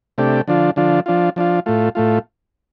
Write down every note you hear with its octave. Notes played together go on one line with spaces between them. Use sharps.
C3 A3 D4 G4
D3 F3 D4 F4
D3 F3 D4 F4
F3 D4 F4
F3 D4 F4
A2 A3 F4
A2 A3 F4